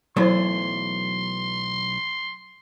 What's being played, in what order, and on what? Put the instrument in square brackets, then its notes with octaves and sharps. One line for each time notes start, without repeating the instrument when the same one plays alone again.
[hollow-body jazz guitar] B1 E3 A3 [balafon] F#3 E4 C5 [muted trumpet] C6